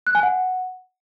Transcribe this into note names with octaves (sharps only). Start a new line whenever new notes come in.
F#6
G#5
F#5